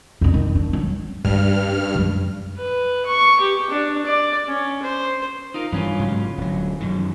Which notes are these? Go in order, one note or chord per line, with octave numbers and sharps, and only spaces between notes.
F2 D3
D#3
D4
F#3
G2 C#4 F6
F#2 G3
B4
C#6
G4
D4
D5
C#4
C5
D#4 F4 A#4
G2 E3 C#4 F4
G#2 C#3 F#3
D1 F#3
F#2 B2 D#3